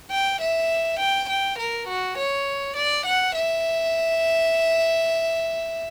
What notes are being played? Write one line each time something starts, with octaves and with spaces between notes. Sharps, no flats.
G5
E5
G5
G5
A#4
F#4
C#5
D5
F#5
E5